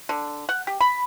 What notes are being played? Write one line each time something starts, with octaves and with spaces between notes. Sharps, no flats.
D3
F#5
G4
B5